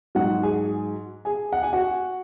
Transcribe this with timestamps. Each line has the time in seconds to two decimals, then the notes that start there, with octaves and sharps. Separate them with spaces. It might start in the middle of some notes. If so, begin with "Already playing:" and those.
0.15 G#2 F#3 F#4 F#5
0.43 G#4 G#5
1.25 G#4 G#5
1.53 F#5
1.63 G#5
1.73 F#4 F#5